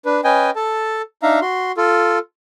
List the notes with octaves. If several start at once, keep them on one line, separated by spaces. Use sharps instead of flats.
D4 B4
C#4 B4 D#5 G5 G#5
A4 A5
D4 D#4 E5 F5 A#5
F#4 C6
F4 A4